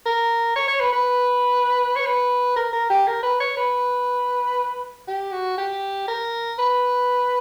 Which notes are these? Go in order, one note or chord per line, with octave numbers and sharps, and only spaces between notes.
A#4
C#5
C#5
B4
B4
C#5
B4
A#4
A#4
G4
A#4
B4
C#5
B4
G4
F#4
G4
A#4
B4